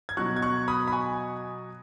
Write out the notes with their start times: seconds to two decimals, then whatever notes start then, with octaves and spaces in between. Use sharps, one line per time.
0.09 G#6
0.17 B2 F#3 C#6 F#6
0.36 G#6
0.42 C#6 F#6
0.68 B5 D#6
0.88 B5
0.92 G#5 C#6